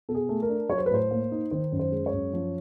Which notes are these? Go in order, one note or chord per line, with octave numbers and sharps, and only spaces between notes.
B2 A4
G#4
A3
A#4
D4
F#3 C#5
C5
B4
A2 C5
A#3
D#4
D#3 C5
F#2
C5
G#3
C#5
F#2
F3